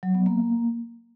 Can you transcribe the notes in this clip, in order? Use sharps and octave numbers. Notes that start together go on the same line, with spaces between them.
F#3
B3
A#3